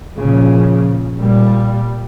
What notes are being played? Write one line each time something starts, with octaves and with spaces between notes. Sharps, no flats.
A#2 C#3 F3
A#2 G3